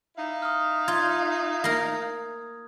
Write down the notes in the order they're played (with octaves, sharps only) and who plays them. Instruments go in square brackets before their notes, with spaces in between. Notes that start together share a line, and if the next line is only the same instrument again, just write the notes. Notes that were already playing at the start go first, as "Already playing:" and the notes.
[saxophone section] D#4 E4 F5
[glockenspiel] D#6 F6
[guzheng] F4 [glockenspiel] G#6
[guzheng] A#3 A#4